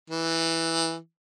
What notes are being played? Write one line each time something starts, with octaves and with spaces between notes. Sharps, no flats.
E3